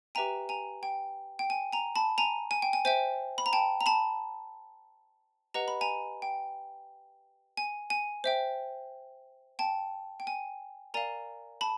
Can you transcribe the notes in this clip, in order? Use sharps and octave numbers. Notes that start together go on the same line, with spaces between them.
G4 B4 E5 G5 G#5 A#5
G#5 A#5
G5
G5
G#5
G#5 A#5
A5 B5
G#5 A#5
G#5
G5
G#5
C5 E5 G5 G#5
B5
A#5
G5 A5
A#5
A5 B5
G4 B4 D#5 F#5 A#5
B5
G#5 A#5
G5
G#5
G#5
C5 E5 G5
G5 A5
G5
G#5
A#4 D5 F5 G#5 A#5
A5 B5